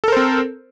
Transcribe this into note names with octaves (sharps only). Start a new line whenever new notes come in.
C4 A4 A#4 C5